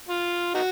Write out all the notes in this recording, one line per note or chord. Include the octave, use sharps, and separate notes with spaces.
F4
D#4 F#4